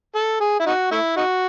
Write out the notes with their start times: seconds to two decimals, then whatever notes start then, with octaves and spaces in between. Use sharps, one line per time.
0.15 A4
0.41 G#4
0.60 E4
0.66 D#4 F#4
0.91 A3 E4
1.16 D#4 F#4